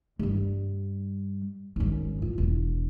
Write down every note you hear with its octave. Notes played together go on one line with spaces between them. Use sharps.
G2 G3
G#1 F#2
F4
E1